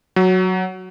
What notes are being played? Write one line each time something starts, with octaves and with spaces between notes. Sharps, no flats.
F#3